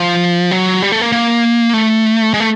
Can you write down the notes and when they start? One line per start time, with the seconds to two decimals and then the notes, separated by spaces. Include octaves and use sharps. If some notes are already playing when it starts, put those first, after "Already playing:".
Already playing: F3
0.51 F#3
0.82 G3
0.92 A3
1.01 A#3
1.12 A#3
1.73 A3
2.34 G#3
2.40 A3